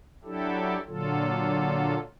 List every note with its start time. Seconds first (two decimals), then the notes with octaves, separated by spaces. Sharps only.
0.24 F#3 D4 E4 G4 A4
0.88 A#2 D3 F#3 F4 A4